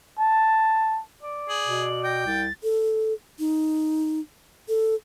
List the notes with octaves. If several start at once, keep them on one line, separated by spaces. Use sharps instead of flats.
A5
D5
G#4 F#7
B2
G5 A#6
C2 A6
A4
D#4
A4